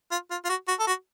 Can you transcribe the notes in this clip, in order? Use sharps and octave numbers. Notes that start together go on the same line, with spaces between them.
F4
F4
F4
F#4
F#4
A4
F#4